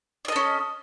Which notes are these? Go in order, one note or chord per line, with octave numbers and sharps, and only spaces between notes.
C#4 A4 D5 D#5